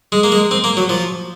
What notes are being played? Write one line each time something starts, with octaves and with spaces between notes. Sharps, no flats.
G#3
A#3
G#3
C4
A#3
F#3
F3